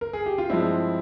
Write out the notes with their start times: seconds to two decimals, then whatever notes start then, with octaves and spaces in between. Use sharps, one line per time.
0.01 A#4
0.13 G#4
0.26 G4
0.38 F4
0.50 G2 F3 G#3 C4 E4